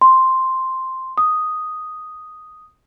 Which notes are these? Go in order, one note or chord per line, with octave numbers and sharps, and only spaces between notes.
C6
D#6